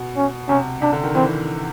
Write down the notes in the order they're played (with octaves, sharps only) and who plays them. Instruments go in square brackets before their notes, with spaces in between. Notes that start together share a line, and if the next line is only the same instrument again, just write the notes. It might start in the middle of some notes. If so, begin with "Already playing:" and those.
Already playing: [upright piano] B2
[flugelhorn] C#4
[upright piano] C3 [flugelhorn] C#4
[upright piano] C3 [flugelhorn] D4
[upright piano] D3
D#3
[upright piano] E3 [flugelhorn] C4